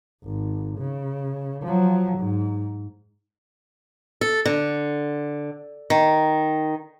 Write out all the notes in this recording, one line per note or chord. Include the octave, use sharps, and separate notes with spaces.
G#1
C#3
F3 F#3
G#2
A4
D3
D#3